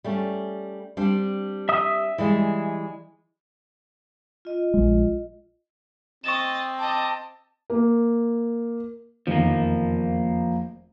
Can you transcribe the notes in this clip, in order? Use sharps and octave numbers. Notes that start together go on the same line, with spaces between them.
G3 A3 C#4
G3 C4 D4
E5 D#6 E6
E3 G3 G#3
F4 D#5
A#1 G#3
C4 D#5 C#6 A6 E7
D#5 A5 D6
A#3
F1 E2 D#3 F3 A#3